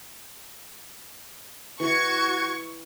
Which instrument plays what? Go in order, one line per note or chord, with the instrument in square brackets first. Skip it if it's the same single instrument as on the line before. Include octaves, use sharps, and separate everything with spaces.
[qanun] E3 [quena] F#4 [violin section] C#6 G#6